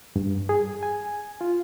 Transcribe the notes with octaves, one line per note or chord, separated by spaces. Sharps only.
G2
G#4
G#5
F4